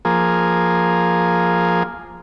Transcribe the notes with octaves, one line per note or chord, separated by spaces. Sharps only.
F3 A#3 G#4